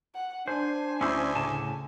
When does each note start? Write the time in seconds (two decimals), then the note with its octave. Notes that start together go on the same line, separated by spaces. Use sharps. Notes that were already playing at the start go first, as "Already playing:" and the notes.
0.15 F#5
0.48 D4 C5 G#5
1.01 D2 C#4 E4 C5
1.35 A2 C#3 A5